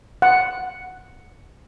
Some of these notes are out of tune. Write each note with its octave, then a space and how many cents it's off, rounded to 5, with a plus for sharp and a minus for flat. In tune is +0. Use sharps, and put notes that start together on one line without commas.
F#5 +5